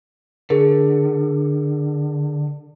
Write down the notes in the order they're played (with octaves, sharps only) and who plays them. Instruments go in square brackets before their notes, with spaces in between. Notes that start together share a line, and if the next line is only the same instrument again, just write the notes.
[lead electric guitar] D3 [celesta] G#4 A#4